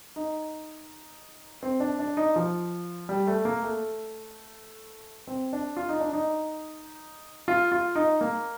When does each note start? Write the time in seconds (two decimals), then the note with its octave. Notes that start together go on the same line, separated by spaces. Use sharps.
0.16 D#4
1.63 C4
1.80 D4
1.99 D4
2.17 D#4
2.36 F3
3.09 G3
3.27 A3
3.45 A#3
3.63 A3
5.27 C4
5.53 D4
5.77 F4
5.89 D#4
6.01 D4
6.13 D#4
7.48 F4
7.72 F4
7.95 D#4
8.21 A#3